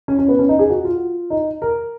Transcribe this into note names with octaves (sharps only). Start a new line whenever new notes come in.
C#4
C#4
B3
C#4
D#4
G#4
F#4
F4
D#4
A#4